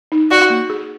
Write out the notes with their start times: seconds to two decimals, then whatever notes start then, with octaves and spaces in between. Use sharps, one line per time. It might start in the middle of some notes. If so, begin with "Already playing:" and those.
0.12 D#4
0.31 F#4 D5
0.50 A#3
0.70 G#4